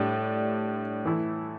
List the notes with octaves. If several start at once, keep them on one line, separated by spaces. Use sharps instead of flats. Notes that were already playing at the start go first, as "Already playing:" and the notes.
Already playing: A2 G3 D4
E3 A3 E4